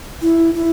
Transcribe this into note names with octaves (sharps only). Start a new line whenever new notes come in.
E4
E4